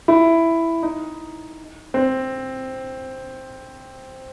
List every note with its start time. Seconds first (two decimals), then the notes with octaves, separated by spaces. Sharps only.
0.08 E4
0.83 D#4
1.94 C4